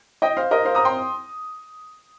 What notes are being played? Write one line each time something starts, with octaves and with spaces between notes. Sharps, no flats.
D#5 G5
C5 F5
A#4 D#5
C5 F5
A#5 D#6
G5 C6